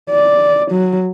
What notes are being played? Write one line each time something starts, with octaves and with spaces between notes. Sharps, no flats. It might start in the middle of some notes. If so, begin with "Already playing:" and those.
D5
F#3